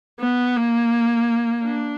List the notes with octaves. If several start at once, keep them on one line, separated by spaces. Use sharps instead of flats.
B3
A#3
D4